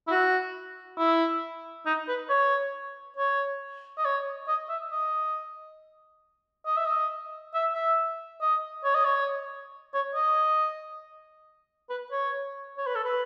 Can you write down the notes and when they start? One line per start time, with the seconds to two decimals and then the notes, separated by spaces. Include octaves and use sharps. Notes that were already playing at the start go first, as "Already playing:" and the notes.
0.08 E4
0.11 F#4
0.98 E4
1.86 D#4
2.08 B4
2.30 C#5
3.17 C#5
3.98 D#5
4.05 C#5
4.48 D#5
4.69 E5
4.92 D#5
6.66 D#5
6.77 E5
6.86 D#5
7.54 E5
7.74 E5
8.41 D#5
8.84 C#5
8.95 D#5
9.05 C#5
9.94 C#5
10.15 D#5
11.90 B4
12.12 C#5
12.78 C#5
12.87 B4
12.96 A4
13.04 B4